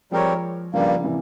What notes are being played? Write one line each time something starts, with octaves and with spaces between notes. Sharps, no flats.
F3 G3 G#3 C4 G4 A#4 C#5
G2 C#3 F3 G3 A#3
C3 E3